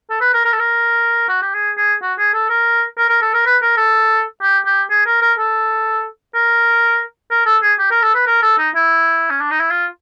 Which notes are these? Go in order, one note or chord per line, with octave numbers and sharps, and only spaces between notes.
A4
B4
A#4
A#4
A4
A#4
F#4
G4
G#4
G#4
F#4
G#4
A4
A#4
A#4
A#4
A4
A#4
B4
A#4
A4
G4
G4
G#4
A#4
A#4
A4
A#4
A#4
A4
G#4
G4
A#4
A4
B4
A#4
A4
D#4
E4
C#4
D4
D#4
E4
F4